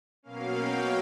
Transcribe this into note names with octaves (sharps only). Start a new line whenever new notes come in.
B2 F#3 A#3 C#4 F5
G5